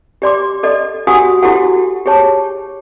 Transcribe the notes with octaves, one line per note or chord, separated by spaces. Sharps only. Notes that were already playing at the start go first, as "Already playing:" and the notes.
G4 D5 C6 D6
A4 D5 D#5
F#4 G4 F#5 G#5 D#6
E4 F#4 G4 A4 F#5
G4 G#4 C#5 A5